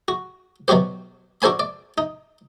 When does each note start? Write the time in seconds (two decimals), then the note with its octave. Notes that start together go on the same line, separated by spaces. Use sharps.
0.08 F#4
0.68 B2 F#3 F#4 G4 C5
1.42 D4 F#4 A4 C5 G#5 B5
1.59 D5
1.98 D#4